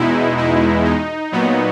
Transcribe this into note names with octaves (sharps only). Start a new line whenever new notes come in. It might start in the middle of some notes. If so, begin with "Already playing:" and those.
Already playing: E2 B2 G#3 D#4 E4
E4
D#4
A#2 F#3 B3